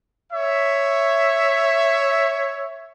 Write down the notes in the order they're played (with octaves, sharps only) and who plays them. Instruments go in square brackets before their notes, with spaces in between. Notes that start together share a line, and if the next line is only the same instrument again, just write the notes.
[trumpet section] C#5 E5